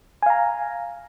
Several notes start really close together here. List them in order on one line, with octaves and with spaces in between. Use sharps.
G#5 F5 A#5